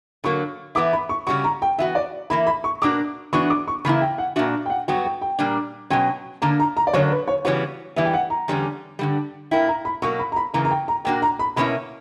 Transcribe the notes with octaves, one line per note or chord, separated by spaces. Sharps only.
D3 F#3 A#3 C#6
E3 B3 E4 D6
B5
C#6
C#3 G3 C#4 F#4 C#6
A#5
G5
E3 B3 F#4 E5
D5
E3 A#3 E4 B5
B5
C#6
B2 A#3 D4 F#4 D6
E3 B3 D4 F#4 C#6
D6
C#6
C#3 E3 A#3 E4 B5
G5
F#5
A#2 A#3 D4 F#4 E5
G5
F#5
G2 F#3 B3 F#4 G5
G5
G5
A#2 G3 A#3 D4
B2 F#3 C#4 G5
D3 A#3 D4 A#5
A#5
A#5
D5
F#2 D3 F#3 A#3 D4 C#5
B4
C#5
C#3 E3 G3 B3 F#4 C#5
E3 G3 B3 E5
G5
F#5
A#5
E2 D3 G3 A#3 C#4
G2 D3 G3
A#2 A#3 E4 G5
A#5
B5
B2 F#3 A#3 C#6
B5
A#5
B5
C#3 E3 A#3 A#5
A#5
G5
A#5
A#2 A#3 D4 F#4 G5
A#5
B5
B2 A#3 C#4 E4 B5